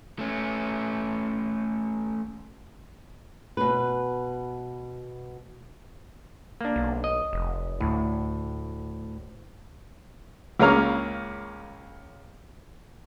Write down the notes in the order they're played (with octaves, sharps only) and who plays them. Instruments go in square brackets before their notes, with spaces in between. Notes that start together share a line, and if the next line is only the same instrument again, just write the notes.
[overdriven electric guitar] A3 C#4
[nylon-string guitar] B2 B4
[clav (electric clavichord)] A#3 D4
[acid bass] B1
[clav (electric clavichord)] D#5
[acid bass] F1
[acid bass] D2 [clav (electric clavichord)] A2
[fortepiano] C#2 C#3 A#3 C#4 A#5 F6